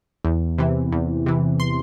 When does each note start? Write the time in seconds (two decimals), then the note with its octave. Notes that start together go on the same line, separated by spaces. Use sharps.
0.25 E2
0.58 C3 E3
0.92 E2
1.26 C3 E3
1.60 C6